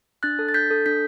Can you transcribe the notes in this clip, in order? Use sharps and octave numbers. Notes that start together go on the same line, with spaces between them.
D4 F#6 A6
A4
A6
D4 G6 B6
A4
D4 G6 B6